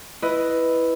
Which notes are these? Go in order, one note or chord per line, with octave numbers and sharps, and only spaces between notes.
E4 B4 D#5